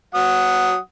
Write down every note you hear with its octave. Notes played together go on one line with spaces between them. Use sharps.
F#3 F#5 D#6